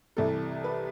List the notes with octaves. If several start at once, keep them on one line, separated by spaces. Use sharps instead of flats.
C2 C3 E3 A4
B4